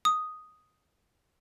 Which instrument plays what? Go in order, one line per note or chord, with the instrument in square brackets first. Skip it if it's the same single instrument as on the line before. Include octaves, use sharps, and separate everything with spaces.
[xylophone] D#6